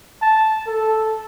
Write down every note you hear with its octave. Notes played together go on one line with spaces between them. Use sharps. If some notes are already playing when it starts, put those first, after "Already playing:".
A5
A4